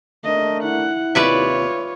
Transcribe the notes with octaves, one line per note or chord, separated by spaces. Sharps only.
A3 D4 A#4 D#5
E4 F#5
D#2 C3 F4 B4 C#5 D5 E5